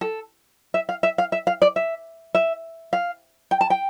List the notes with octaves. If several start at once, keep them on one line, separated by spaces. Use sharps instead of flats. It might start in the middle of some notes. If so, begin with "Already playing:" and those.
A4
E5
F5
E5
F5
E5
F5
D5
E5
E5
F5
G5
A5
G5